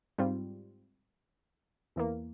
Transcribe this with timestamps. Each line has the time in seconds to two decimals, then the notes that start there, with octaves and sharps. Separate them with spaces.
0.18 G#2 G3 C4 F4
1.96 E2 E3 A#3